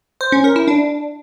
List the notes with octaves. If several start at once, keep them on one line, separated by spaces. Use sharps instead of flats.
C5
C#4
A#4
E4
D4